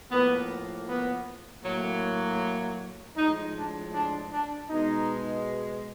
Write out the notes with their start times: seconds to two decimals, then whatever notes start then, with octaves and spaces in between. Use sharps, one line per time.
0.11 A2 F3 A#3 B3
0.87 B3
1.63 A2 F#3 A#3
3.16 A2 F3 G#3 D#4
3.55 D4
3.92 D4
4.31 D4
4.69 B2 G#3 D#4